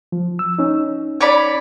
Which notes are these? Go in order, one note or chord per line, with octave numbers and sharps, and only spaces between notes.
F3
E6
C#4 D#4
C#5 D5 B5